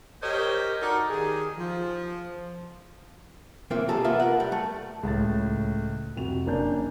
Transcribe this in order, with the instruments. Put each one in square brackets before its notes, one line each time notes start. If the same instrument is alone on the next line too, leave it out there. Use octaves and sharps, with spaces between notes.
[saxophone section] G4 A#4 C5 C#5 D#5
D#4 F#4 A4 A#4 D5
D#3 G4 G#4
F3
[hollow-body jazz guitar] E3 A3 A#3 C4 F4
B1 C3 G#4 A4 A#5
A#3 B3 F4 E5
A#4 F#5
G3
A3
[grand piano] C#2 A2 A6
F2 C3 F#4 F7
F#1 A#3 C#4 D4 A5 G6